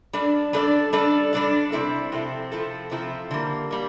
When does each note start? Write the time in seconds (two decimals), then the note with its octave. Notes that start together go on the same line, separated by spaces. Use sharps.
0.13 G3 D4 A4 D5
0.53 G3 D4 A4 D5
0.93 G3 D4 A4 D5
1.33 G3 D4 A4 D5
1.72 C3 F3 C4 E4 A4
2.12 C3 F3 C4 E4 A4
2.52 C3 F3 C4 E4 A4
2.91 C3 F3 C4 E4 A4
3.31 D3 G3 A#3
3.71 G3 A#3